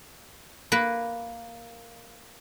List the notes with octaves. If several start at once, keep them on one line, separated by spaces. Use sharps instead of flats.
A#3 B4